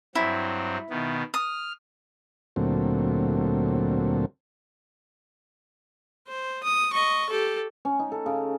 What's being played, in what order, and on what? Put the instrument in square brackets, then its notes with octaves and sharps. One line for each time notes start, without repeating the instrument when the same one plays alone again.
[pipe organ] G2 F#3 C4 [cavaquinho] E4
[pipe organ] B2 D#3 B3
[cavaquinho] D#6 [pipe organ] F6
[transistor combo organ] D2 A#2 F#3 A3 C4
[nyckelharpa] C5
D#6
D#5 C#6
G4 A4
[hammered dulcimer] C#4
D#4
A4
C#3